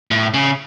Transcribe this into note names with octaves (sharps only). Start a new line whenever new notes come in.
A2
C#3